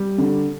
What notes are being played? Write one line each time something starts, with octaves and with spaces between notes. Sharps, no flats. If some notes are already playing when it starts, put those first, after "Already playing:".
Already playing: G3
D3